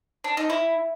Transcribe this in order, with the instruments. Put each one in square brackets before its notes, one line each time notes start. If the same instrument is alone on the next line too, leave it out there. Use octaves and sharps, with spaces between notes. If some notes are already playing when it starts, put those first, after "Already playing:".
[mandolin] D4
D#4
E4